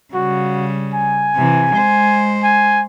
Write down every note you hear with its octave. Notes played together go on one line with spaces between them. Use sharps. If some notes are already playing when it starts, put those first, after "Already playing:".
C#3 G3 F#4
G#5
C3 E3
G#3 C5
G#5